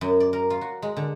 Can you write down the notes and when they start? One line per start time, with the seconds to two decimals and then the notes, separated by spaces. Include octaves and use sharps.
0.01 F#2
0.20 D5
0.33 A#4
0.50 F4
0.61 F#4
0.82 G#3
0.97 D3